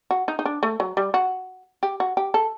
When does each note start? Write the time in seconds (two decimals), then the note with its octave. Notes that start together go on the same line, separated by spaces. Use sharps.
0.11 F#4
0.28 D#4
0.39 D#4
0.45 D4
0.63 A3
0.80 F#3
0.97 G3
1.14 F#4
1.83 G4
2.00 F#4
2.17 G4
2.34 A4